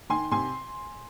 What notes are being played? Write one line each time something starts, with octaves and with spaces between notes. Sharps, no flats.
D#3 G#5 C6
C3 G#5 C6